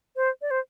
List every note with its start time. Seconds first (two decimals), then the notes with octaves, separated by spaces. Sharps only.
0.16 C5
0.42 D5
0.51 C5